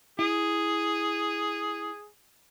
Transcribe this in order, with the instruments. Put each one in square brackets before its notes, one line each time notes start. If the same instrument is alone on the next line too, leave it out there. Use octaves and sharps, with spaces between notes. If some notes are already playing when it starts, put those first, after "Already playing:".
[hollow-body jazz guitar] E4 [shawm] G#4